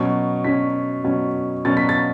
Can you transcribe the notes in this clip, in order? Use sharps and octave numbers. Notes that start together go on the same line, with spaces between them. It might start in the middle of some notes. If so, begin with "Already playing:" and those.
Already playing: B2 F#3 C#4
B2 F#3 C#4 B6
B2 F#3 C#4
B2 F#3 C#4 A6
B6
A6